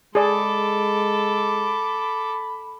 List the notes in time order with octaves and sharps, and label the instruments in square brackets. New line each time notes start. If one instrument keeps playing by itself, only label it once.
[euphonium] G#3 [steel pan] G#4 D5 [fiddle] A4 D6 [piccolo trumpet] B5